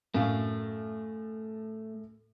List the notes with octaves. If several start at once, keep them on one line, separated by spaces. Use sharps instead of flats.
F#2 A2 A3 F5